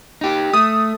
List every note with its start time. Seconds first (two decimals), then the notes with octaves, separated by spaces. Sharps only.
0.21 D#4 G4
0.53 A3 D#6